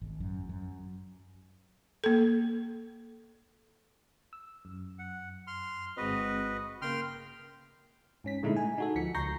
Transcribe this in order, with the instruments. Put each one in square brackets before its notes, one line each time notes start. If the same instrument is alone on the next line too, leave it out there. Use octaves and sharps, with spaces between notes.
[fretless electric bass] G#1
F#2
F#2
[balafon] A#3 A4
[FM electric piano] E6
F#2
[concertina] F#5
C6 F6
[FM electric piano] G1 G#3 C4 [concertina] F#4 B4 D#5
[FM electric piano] C#3 A#3 [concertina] G5 C6 F6
[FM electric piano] G#2 C#4 B6
A#2 D3 G#3 A3 D#4 E4
G#5
D#4 F#4 A4
D2 F3 B6 C#7
C#2 A#5 C#6 G6 A#6 C7